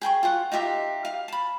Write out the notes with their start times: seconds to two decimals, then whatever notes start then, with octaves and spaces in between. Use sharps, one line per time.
0.02 G#4 G5 A#5 C#6
0.23 F4 F#5
0.52 D#4 F4 G4 E5
1.05 F5
1.28 A5 B5